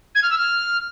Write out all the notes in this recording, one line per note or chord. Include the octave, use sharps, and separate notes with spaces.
G#6
F6
E6
F6